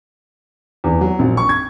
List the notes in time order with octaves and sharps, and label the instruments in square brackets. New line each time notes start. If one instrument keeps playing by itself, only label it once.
[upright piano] E2
F#3
A#1
C#6
G#6